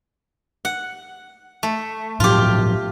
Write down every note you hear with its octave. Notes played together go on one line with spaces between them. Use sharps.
F#5
A3
A2 F3 F#3 F4 G4